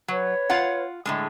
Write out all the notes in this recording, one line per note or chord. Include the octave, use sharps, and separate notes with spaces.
F#3 B4 C#5
F4 F5 F#5
A2 D3 G#3